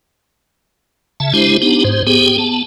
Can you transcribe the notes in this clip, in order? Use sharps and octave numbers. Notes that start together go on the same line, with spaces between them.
C#3 E5 A5
G#3 D4 E4 G4 C5
B3 D4 D#4 G4
G#2 C5
B3 G4 G#4 G5
B3 A5